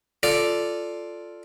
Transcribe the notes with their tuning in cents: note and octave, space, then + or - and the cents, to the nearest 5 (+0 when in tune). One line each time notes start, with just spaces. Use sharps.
F4 +0 A4 +0 D5 +0